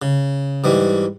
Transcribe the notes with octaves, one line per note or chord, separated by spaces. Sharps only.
C#3
G#2 E3 G3